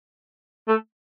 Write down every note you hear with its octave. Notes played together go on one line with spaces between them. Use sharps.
A3